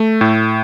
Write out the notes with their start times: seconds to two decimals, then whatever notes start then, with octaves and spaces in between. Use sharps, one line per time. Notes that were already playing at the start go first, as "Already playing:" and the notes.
Already playing: A3
0.21 A2